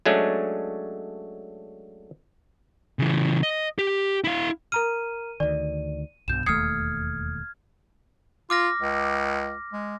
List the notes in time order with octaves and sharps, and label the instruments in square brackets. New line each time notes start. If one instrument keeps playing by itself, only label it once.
[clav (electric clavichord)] F#3 G#3 A3 C#4 D4
[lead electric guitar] C#3 E3
D#5
G4
E4 F5
[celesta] A#4 A#5 F6 [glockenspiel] D#7
[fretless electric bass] D2 D#3 [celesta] D5
[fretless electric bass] B1 G2 B2 [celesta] G6 E7
[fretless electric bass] E1 D#2 A3 [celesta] D#6 C7 C#7 [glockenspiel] F6 G#6
[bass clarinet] F4 [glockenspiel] D6 F6 A#6
[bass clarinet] C#2
G#3